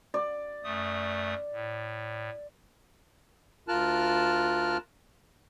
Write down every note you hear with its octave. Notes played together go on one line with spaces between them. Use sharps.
D5
F#2 A3 D#6
A2
D2 F4 A#4 A5 F6 F#6